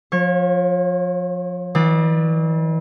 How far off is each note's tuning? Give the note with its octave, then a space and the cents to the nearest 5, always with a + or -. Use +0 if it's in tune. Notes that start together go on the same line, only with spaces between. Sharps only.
F3 +25 C#5 -30
E3 -35 D5 +35